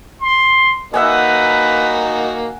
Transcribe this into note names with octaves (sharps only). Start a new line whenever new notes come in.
C6
A#3 D#4 F#4 B4 E5 F#5 G#5